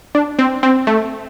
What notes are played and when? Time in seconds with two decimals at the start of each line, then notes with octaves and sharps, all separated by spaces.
0.15 D4
0.39 C4
0.63 C4
0.87 A3